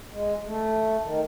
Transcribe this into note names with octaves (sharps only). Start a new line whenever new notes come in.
G#3
A3
D#3